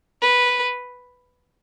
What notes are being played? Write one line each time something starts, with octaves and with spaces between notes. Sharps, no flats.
B4